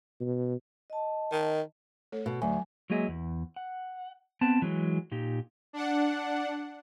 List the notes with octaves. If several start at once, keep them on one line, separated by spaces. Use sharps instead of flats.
B2
D#5 A5
D#3
A3 A4 C#5
B2
D2 F#3 G#5
F#3 G#3 A#3 G#4 D#5 E5
E2
F#5
B3 C4 A5
E3 F#3 G#3
A#2 D#4 G4
D4 F#5